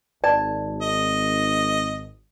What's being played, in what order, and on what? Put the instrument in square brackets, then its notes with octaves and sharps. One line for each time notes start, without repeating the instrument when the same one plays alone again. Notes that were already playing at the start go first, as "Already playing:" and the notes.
[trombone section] G#1 [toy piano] D5 [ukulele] A5
[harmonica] D#5